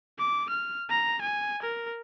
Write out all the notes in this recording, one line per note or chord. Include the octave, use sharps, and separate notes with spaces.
D6
F6
A#5
G#5
A#4